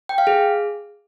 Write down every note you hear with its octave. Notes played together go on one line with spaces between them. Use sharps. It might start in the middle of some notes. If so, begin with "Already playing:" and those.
G5
F5
G#4